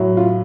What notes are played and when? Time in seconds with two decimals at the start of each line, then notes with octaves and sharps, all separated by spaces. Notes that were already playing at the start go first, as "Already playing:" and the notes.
Already playing: A2 F#3
0.17 F4